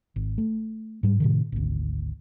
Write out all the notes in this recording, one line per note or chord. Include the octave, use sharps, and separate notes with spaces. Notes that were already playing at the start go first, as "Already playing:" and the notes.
G#1
A3
G#2 G3
A2 C3 D#3
G#1 D2